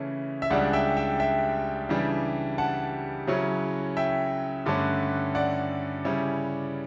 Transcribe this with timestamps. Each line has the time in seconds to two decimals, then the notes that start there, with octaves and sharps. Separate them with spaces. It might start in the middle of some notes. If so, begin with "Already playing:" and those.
Already playing: C#3 E3 A3 C#4
0.42 E5
0.50 C#2 C#3 G3 D4 D5 F#5
0.73 E5 G5
0.97 E5 G5
1.20 E5 G5
1.89 C#3 E3 G3 D4
2.58 F#5 A5
3.27 C#3 F#3 C#4 E4
3.97 E5 G5
4.66 G2 D3 A3 C#4
5.35 D5 F#5
6.04 C#3 G3 C#4 E4